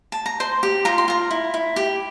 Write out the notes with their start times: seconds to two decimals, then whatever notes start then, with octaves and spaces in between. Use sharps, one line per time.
0.12 A5
0.26 A#5
0.40 C5 C6
0.63 G4
0.85 F4 A#5
0.98 C6
1.08 F4 A#5
1.31 E4
1.54 E4
1.76 G4